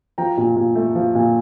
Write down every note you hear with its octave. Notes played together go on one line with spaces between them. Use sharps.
F3 G5 A#5
A#2
A#2
A3
F3
A#2